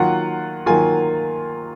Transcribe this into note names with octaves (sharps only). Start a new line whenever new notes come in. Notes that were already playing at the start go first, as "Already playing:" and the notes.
Already playing: D#3 F#3 A#3 F4 F#5
D#3 F#3 A#3 F4 G#5